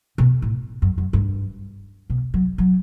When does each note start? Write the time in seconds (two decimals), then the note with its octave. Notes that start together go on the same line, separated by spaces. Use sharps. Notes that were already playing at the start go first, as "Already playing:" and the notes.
0.18 B2
0.42 A2
0.82 F#2
0.98 F#2
1.13 G2
2.10 B2
2.34 F#3
2.58 F#3